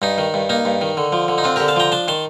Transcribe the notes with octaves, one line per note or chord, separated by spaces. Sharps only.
G2 D#4
D#3
G2
A#3 D#4
G2
D#3
D3
F3
D3
D#4
C4 D4 F4
D3 G4 A#4
F5 A5
F3 G5 A#5
D4 A5 C6
D#3 A5 C6